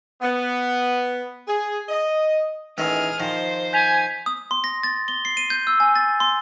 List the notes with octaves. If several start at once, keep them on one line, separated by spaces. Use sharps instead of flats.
B3
G#4
D#5
A1 D#3 E4 G#4 F6
D#3 F3 C5
G#5 G6 B6 F7
D#6
C6
A#6
A6
G7
C7
D#7
G6
E6
G#5
A6
C6